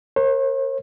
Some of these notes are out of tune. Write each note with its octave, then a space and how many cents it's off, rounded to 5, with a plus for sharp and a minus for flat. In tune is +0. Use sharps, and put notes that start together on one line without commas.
A#4 +0 C#5 -45